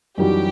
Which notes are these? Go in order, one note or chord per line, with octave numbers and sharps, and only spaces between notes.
F#2 E3 G3 D#4 F#4 G4